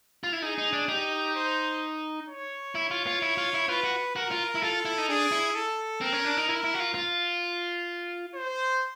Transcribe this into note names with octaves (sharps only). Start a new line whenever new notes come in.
F4
E4
D#4 G#4
D#4
D4
D#4 G4
C5
C#5
E4
F4
F4
E4
F4
E4
F4 B4
F#4
F#4 A#4
F4
E4
F4 A4
E4
D#4
D4 G#4
E4
A4
C4 A#4
C#4
D4
D#4
E4 A#4
E4
F#4
F4
F4
C5